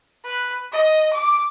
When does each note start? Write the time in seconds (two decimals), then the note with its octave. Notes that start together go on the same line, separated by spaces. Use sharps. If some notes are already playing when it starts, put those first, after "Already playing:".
0.24 B4
0.72 D#5
1.13 D6